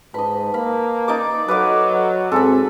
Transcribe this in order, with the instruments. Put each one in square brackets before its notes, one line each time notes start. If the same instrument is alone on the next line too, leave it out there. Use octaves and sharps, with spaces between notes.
[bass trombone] G#2 [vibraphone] B4 A5 [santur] D#5 B5
[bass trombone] A#3 [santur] F5 B5
[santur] D#4 D5 D6
[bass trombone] F#3 [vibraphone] A4 D#5 [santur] B4 F5 D6
[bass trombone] G#2 [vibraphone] C4 F#4 G#4 [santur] A4 G#5 B5